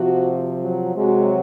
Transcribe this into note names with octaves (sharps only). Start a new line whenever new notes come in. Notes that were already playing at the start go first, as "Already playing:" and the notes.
Already playing: C3 F3 F#4
F#3
C3 F#3 G#3